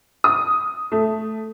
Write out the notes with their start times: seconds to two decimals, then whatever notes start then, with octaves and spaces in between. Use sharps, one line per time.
0.24 D#6
0.92 A3